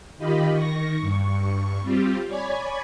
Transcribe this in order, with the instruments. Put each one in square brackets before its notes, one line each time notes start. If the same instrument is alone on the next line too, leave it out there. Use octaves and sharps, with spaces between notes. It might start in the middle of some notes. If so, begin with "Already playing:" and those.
[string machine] D#3 F4 G4 D#5 B5
D#3 C#6 A#6
G2 C#6
G3 C4 F4 G4
C#5 D5 G#5 B5 G#6